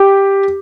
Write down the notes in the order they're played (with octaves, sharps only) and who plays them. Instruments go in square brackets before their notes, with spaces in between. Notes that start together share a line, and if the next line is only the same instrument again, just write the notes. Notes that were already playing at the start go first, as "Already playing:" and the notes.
Already playing: [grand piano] G4